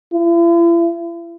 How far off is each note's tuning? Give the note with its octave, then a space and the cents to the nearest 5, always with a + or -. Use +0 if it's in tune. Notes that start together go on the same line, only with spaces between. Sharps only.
E4 +45